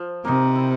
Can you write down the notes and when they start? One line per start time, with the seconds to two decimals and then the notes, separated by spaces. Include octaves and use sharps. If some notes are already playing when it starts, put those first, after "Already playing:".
Already playing: F3
0.25 C3 A#3 D#4
0.56 E4